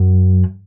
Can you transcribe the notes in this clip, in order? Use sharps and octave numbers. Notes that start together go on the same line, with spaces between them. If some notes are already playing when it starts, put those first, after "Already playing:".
Already playing: F#2